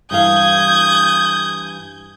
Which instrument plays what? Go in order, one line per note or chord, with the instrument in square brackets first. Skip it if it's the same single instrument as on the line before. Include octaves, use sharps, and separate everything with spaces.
[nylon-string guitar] G2 E3 F5 [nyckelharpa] D#6 [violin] G6 G#6